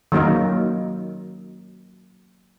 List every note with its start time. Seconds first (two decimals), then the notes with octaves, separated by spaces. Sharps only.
0.12 D#3 F#3 A#3 D#4